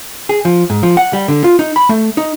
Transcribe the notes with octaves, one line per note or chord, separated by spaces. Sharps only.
G#4
F3
G#2
F3
F#5
G3
D3
F4
D#4
B5
A3
D#4